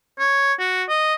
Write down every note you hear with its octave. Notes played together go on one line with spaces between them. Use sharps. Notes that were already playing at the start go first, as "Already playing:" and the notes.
C#5
F#4
D#5